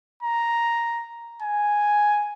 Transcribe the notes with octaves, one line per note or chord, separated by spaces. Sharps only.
A#5
G#5